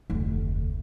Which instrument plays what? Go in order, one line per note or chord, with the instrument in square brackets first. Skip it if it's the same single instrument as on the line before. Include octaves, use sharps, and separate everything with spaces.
[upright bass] F1 D2